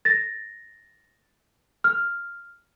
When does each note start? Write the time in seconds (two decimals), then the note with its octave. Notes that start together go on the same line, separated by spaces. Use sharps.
0.05 A6 A#6
1.84 F6